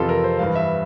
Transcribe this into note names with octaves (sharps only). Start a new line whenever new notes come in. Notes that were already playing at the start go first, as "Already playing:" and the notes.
Already playing: F2 C3 E3 F4 A4
A#4
C5
G2 E3 F5
E5